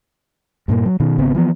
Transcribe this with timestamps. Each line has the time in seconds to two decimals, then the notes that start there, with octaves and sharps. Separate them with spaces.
0.68 G2 A#2 A#3
0.85 F#3
1.00 B2 D#3
1.18 G#1 C#3 B3 C4
1.34 E3 F3 B3